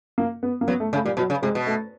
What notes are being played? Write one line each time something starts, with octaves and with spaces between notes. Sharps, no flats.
A#3
B3
A#3
F#3 B3
A3
C#3 A3
A#2 G3
B2 F#3
C#3
C3 G#3
B2
A3